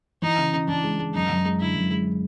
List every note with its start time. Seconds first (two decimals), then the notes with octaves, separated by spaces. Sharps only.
0.22 E3 D#4
0.38 C#3
0.53 C#3
0.68 E3 D4
0.84 G#3
0.99 G#3
1.14 F#2 D#4
1.29 F#2
1.45 G#3
1.60 D3 E4
1.75 F#2
1.91 G#3